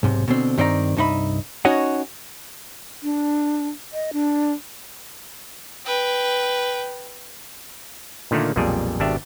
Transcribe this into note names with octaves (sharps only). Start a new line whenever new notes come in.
B1 G#2 C3
B2 D3 C4
G2 D#3 C4 D5 D#5 A#5
C2 G2 D#4 E5 B5
C#4 D#4 F#4 C#5 D#5 F#5
D4
D#5
D4
B4 G5
A#2 D3 D#3 A3 A#3
B1 F2 A#2 G3 G#4
G#1 B2 D4 G4 E5